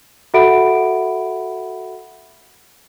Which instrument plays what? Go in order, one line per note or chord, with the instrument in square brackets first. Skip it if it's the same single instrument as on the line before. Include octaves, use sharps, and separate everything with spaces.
[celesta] F#4 A4 E5 F#5 B5 D7